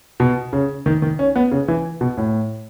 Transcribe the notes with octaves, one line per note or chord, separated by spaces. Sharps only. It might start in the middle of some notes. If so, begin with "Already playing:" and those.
B2
C#3
D#3
D#3
C#4
B3
C#3
E3
B2
A2